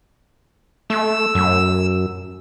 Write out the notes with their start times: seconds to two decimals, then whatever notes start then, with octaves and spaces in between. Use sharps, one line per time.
0.90 A3 E6
1.35 F#2